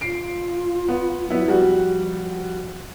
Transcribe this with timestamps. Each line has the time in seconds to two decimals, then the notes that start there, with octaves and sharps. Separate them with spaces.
0.01 F4 C7 D7
0.88 B3
1.30 F#3 B3 E4
1.48 F3 G3 F#4